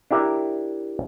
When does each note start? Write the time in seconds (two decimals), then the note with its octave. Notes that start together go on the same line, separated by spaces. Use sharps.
0.11 D4 E4 G4 A#4 E5